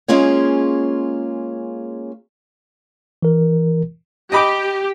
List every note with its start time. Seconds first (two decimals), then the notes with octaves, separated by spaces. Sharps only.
0.08 G#3 A#3 C#4 F4 G#4 C#5
3.22 E3 A#4
4.32 G4 D#5 B5 D6